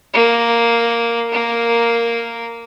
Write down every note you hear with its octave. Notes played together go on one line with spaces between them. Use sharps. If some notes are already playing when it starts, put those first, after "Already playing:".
A#3
A#3 A#4